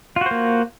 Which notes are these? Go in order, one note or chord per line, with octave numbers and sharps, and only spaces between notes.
A#3 F4 F#4 C5